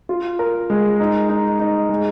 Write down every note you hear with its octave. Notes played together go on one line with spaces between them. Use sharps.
F4
A#4
G#3
D#4
D#4
D#4
G#3